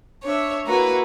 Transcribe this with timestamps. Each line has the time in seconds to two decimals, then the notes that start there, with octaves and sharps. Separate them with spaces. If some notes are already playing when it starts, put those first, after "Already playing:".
0.25 D4 C#5 E5
0.65 A#3 E4 F#4 B4 A#5